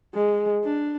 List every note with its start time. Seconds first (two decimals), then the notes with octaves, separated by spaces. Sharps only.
0.15 G#3
0.65 D4